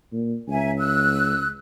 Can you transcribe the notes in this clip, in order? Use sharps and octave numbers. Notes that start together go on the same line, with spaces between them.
A#2
C#2 E5 G#5 A#5
E6 F#6